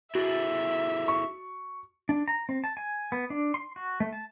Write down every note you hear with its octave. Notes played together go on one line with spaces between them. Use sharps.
E4 F#4 G#4 A4 E5 A6 F#7
C#6
D4
A#5
C4
A5
G#5
B3
D4
C6
F#4
A3
A5